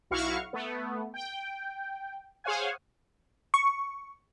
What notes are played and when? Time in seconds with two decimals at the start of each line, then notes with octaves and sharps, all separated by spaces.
0.11 B1 E4 F#4 F5 C#6 F6
0.53 A3 B3
1.14 G5
2.44 G#4 C5 C#5 F5 F#5 G#5
3.54 C#6